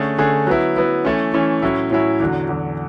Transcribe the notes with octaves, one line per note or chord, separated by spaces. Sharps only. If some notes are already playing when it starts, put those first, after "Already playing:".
Already playing: D3 A3 C#4 G#4
D3 A3 C#4 G#4
F#3 B3 E4
F#3 B3 E4
E3 A3 C#4
E3 A3 C#4
A2 F#3 C#4 E4
A2 F#3 C#4 E4
E2 D3 F#3
E2 D3 F#3